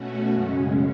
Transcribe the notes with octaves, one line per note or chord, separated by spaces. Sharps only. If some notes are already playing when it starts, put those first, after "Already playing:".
Already playing: B2 A3 C#4 F#4
F#2 C#3 G#3 C#4